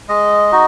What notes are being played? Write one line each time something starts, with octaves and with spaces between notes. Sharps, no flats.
G#3 D#5
D#4 F#4